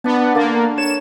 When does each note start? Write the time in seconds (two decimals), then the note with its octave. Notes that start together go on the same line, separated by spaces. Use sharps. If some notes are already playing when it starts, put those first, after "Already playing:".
0.04 B3 D4 A5
0.35 D3 A#3 A5
0.78 C#5 E7